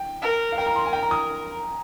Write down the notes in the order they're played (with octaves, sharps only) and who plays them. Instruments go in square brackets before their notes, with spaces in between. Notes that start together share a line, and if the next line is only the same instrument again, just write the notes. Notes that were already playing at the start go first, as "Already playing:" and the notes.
Already playing: [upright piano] G5
[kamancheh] A#4
[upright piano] F5
[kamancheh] A#4 [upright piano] G5
[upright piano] A#5
C6
G#5
G5
A#5
D#6